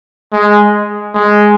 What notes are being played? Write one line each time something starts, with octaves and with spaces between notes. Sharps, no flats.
G#3
G#3